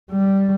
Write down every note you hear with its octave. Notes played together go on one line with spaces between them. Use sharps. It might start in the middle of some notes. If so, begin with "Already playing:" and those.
G3